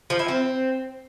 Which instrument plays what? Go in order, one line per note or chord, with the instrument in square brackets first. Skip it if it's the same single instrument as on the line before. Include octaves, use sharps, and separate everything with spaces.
[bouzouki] F3
E4
C4